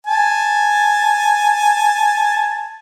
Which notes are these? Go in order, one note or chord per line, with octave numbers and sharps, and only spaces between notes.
G#5 A5